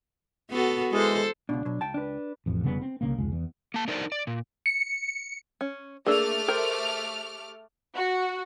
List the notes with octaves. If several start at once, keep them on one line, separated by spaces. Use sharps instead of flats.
B3 F#4 A4
E3 G#3 A4 C5
C#2 B2 D4
B2 F#3
C#2 G5 A5
D4 B4
A1 F2
F1 C#3 G3 B3
C4
C2 C#3 A#3
F1 C#2 G#3
E2
A#3 A5
D4 D#4 A#4 C5 D5
D5
A#2
C#7
C#4
A3 A#3 D4 G#4 D5 D6 E6 F6
G4 A#4 C5
F#4